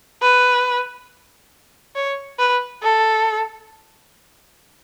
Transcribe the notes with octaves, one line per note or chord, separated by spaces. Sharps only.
B4
C#5
B4
A4